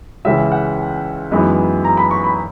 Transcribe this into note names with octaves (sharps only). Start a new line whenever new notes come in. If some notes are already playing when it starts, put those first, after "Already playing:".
C#2 C#3 E3 E5
F#5
F#2 E3 G#3 B3 D#4
A#5
B5
C#6
B5